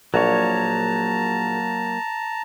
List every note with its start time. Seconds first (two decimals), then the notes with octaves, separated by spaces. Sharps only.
0.14 A#1 F#3 A#3 C#5 A5 A#5